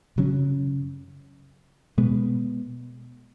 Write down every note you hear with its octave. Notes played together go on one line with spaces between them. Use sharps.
F#2 C#3 F#3 C#4
B2 G#3 B3